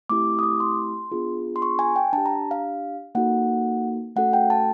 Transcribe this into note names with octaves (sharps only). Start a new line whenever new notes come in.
A3 C4 E4 G4 D6
D#6
D6
C6
B3 D4 F4 G#4
C6
C#6
G#5
G5
D4 G4 A5
A#5
F5
A#3 D#4 F#4 A4 F#5
A3 C#4 F#4 A4 F#5
G5
A5